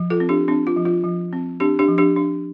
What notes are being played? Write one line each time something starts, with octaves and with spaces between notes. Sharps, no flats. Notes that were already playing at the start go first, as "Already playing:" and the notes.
Already playing: F3
F4 A4
C4
D4 G4
C4 D4
F4
F3
F4
F3
C4
C4 D4 G4
D4 G4
F3
D4 G4
D4